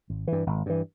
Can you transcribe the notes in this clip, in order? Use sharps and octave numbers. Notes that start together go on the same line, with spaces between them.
G#1
G2 E3
G#1
G2 E3